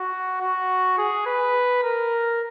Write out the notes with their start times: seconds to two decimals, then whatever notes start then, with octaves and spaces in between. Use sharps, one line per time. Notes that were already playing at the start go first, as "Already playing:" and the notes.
Already playing: F#4
0.41 F#4
0.98 G#4
1.26 B4
1.83 A#4